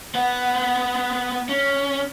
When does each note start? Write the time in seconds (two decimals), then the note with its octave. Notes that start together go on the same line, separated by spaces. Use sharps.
0.15 B3 B4
1.49 C#4